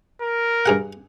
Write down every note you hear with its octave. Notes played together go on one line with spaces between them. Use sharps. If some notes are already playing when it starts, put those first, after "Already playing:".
A#4
G2 G#4 F#5